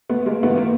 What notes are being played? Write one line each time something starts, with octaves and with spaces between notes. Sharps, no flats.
A3 B3
G#3 A#3
G#2 E3 A3 B3
A#3